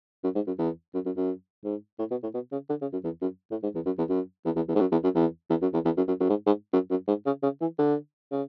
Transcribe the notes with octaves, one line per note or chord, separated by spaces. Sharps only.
F#2
G#2
F#2
E2
F#2
F#2
F#2
G#2
A2
B2
A2
B2
C#3
D3
C#3
F#2
E2
F#2
A2
G#2
E2
F#2
E2
F#2
E2
E2
E2
G#2
F#2
E2
F#2
E2
E2
F#2
E2
E2
F#2
F#2
F#2
G#2
G#2
F#2
F#2
G#2
C#3
C#3
E3
D3
C#3